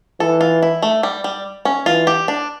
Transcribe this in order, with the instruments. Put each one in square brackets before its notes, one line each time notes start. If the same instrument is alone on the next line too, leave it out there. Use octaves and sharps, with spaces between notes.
[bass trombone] E3 [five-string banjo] A4
[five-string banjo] F4
E4
A3
G3
G3
C#4
[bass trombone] E3 [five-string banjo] F4
[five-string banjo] G4
D4